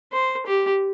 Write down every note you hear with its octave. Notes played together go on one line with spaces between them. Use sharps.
C5
G4